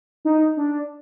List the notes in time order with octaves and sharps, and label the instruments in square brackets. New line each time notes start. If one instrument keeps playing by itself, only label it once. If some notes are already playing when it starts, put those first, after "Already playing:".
[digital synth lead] D#4
D4